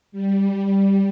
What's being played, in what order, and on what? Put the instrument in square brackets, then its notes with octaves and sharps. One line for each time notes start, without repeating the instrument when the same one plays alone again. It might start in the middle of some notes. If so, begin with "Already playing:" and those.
[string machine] G3